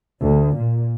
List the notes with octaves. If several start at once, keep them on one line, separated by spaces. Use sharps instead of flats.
D2
A#2